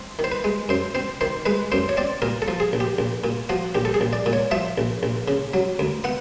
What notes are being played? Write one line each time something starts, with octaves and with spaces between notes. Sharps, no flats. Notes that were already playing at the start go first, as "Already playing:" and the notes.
Already playing: C4
D#3
C5
B4
G#3
F#2 C5
C4 C5
D#3 C5
G#3 B4
F#2 C5
C#5
C4 D5
A#2 A#4
A4
F3
G#4
A#1
G4
A#1
A#2
F3 F#4
A#1 G4
A4
G#4
A#1
D5
A#2
C#5
F3 E5
A#1
A#1
C#3
F#3
D2
B3 F#5